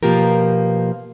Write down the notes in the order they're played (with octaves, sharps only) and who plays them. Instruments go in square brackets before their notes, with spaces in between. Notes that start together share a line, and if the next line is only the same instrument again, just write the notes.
[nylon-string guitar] B2 F3 A#3 F4 G4 A#4